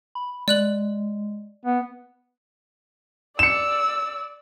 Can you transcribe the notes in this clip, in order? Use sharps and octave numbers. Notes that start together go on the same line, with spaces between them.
B5
G#3 D5 F#6 F#7
B3
D5 E6 C#7 E7